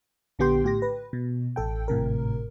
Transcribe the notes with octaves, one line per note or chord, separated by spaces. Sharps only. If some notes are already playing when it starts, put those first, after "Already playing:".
A#1 D3 B3 G4 G5 C6
A2 G4 A#6
B4
B2
A1 A4 G5
G#1 A2 C3 A#4